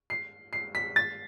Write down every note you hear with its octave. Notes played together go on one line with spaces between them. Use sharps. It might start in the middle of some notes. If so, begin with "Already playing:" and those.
C7
C7
B6
A6